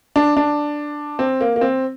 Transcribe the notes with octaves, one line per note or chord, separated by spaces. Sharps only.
D4
D4
C4
A#3
A#3
C4